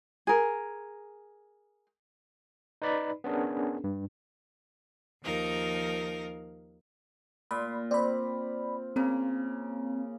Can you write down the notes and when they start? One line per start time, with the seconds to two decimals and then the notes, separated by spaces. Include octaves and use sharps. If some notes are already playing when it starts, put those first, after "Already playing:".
0.27 G#4 A#4
2.82 D#4 B4 D5 B5
3.24 B3 C#4 D4 G#4 A#4
3.84 G2
5.22 D#2 F3 D#4 A#4 F5
7.51 A#2 B5 C6
7.91 C4 D5 B5
8.96 C#3 A#3 C4